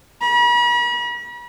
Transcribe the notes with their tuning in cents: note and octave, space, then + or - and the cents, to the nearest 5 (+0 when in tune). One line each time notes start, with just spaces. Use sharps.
B5 -45